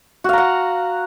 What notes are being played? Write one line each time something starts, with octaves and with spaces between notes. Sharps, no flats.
F#4 F5 F#5 A#5